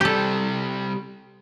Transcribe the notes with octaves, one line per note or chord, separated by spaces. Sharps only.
C3 G3 G4 A4